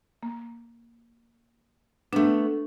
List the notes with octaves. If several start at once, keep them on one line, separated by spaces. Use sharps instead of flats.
A#3
A3 B3 D4